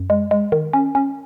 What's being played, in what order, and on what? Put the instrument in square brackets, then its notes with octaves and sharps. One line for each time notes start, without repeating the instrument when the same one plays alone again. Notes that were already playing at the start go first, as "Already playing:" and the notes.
Already playing: [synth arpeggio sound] F#2
G#3
G#3
D#3
C#4
C#4